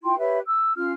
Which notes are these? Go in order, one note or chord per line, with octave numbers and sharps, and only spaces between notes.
E4 F4 G5 C6
G4 B4 C#5 E5
E6
C#4 F4 F6